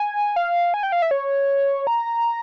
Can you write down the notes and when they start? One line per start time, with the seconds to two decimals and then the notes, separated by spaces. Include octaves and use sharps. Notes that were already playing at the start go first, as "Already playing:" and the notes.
Already playing: G#5
0.36 F5
0.74 G#5
0.83 G5
0.92 F5
1.02 E5
1.11 C#5
1.87 A#5